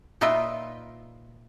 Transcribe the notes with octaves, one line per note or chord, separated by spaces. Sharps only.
A#2 D#4 F4 B4 E5 G5